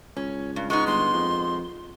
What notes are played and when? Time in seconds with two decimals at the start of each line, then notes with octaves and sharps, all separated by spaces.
0.17 C#2 C#4
0.56 G2
0.70 G#3 B3 D#4 C#6
0.87 G1 C6
1.14 F2